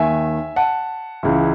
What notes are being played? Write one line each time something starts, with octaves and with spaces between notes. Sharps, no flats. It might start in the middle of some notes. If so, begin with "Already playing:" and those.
Already playing: D#2 D#3 E5 G#5
F#5 A5
C#2 C#3 E3